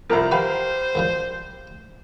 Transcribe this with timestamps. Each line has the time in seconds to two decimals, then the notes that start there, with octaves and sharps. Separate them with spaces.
0.10 C2 F3 A#4 A#5 B5
0.32 F#4 G4 B4 C5 F5
0.95 F#2 F3 G3